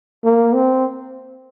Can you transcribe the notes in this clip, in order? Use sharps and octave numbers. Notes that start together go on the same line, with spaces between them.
A#3
C4